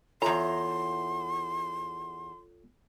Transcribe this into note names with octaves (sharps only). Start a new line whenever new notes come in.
E2 F4 A4 C#5 A#5 C6